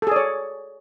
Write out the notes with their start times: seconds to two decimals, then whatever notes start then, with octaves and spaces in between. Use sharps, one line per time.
0.02 A4
0.07 G#4
0.12 D5
0.16 C#5